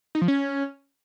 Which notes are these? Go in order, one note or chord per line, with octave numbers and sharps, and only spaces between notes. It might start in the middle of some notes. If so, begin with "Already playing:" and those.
D#4
F3
C#4